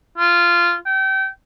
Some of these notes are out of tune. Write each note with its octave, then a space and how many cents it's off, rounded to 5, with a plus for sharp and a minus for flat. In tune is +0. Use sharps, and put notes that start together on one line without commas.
F4 -15
G5 -30